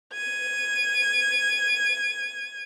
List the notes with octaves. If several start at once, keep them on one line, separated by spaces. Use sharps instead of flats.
G#6 D#7